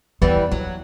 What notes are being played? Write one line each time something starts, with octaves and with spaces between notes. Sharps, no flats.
E2 E3 G3 B3
E2 F#3